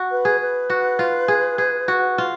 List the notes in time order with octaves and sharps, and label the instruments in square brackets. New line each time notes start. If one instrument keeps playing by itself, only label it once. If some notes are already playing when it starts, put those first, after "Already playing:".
Already playing: [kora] F#4
[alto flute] B4
[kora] G#4
[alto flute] B4
[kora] F#4
F4
G#4
G#4
F#4
F4